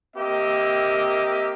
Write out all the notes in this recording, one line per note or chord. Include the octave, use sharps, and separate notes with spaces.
A#3 C4 G4 D#5 E5